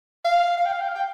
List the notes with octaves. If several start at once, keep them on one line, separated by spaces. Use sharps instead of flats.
F5
F5
G5
F5
G5
F5
G5